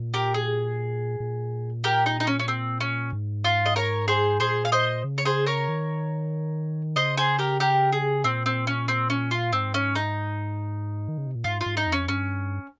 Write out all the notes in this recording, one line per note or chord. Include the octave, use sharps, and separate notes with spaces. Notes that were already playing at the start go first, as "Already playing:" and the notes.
Already playing: A#2
G4 A#4
G#4
A#2
G4 A#4
D#4
D#4
C#4
C#4
C4
C#4
G#2
F4
D#5
A#4 C#5
G#4 C5
A#2 G#4 C5
F5
C5 D#5
C#3
C#5
G#4 C5
A#4 C#5
D#3
C#3 C5 D#5
G#4 C5
G4 A#4
G4 A#4
G#4
A#2 C4
C4
C#4
C4
C#4
F4
G#2 C4
C#4
D#4
D#3
C#3
C3
A#2
G#2 F4
F4
G#2
D#4
F2
C#4
G2 C#4